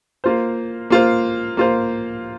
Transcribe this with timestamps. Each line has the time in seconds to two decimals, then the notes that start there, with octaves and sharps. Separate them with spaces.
0.24 A#3 F4 C5
0.90 A#3 F4 C5
1.57 A#3 F4 C5